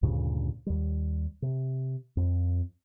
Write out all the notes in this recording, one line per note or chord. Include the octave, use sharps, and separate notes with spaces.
D2 G2 A#2 C#3
D#2 G3
C3
F2